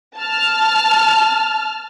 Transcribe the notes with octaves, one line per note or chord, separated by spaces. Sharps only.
A5 F6